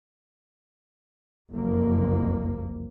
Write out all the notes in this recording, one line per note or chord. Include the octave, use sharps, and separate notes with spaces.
F#1 C2 F2 A#3